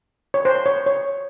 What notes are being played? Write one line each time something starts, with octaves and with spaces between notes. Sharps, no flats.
C#5
C5
C#5
C#5